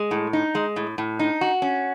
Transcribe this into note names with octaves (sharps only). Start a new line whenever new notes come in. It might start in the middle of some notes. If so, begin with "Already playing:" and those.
Already playing: G#3
A2
D#4
G#3
A2
A2
D#4
F#4
C#4